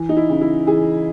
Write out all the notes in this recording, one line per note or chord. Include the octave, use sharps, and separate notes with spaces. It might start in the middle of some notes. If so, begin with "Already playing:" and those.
Already playing: E3
D#4
E4
C#3
E4
E3 G#4